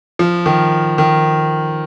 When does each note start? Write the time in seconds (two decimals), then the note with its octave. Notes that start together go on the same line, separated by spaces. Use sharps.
0.19 F3
0.46 D#3
0.98 D#3